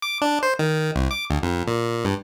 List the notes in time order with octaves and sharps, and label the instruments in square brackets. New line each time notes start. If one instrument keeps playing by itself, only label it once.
[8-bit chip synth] D6
D4
C5
D#3
C2
D6
D2
F2
A#2
G2